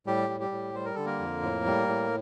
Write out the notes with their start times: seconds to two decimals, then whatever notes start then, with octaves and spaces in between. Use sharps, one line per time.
0.06 A2 G3 G4
0.29 G3
0.40 G3 G4
0.52 A2
0.74 G3 C5
0.85 A#4
0.95 D3 A4
1.05 A#3 A#4
1.19 F2
1.42 A2
1.66 G3
1.88 A2